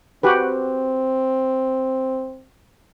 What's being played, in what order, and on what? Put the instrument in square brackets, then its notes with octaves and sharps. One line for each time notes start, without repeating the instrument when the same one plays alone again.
[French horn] C4 [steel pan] F#4 G4 B4